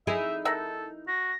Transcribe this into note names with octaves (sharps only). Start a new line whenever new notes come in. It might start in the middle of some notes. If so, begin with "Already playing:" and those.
D#4 E4 G#4 E5
A4 A#4 E5 F#5
F#4 A#6